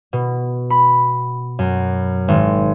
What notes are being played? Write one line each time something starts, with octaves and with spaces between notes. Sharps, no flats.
B2
B5
F#2
G#1